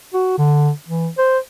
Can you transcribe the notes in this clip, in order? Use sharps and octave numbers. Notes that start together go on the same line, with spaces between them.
F#4
D3
E3
C5